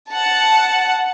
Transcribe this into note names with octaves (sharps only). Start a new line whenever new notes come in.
F#5 A5